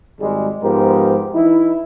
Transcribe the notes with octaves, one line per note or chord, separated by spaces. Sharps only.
G#1 G3 G#3
G#2 F3 B3 G4 A#4
E3 D#4 E4